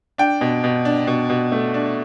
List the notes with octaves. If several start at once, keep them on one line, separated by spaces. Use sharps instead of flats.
D4 G5
B2
B2
D4
B2
B2
A3
D4